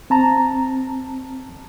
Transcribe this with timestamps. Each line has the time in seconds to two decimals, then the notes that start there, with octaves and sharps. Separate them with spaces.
0.10 C4 A5 A#5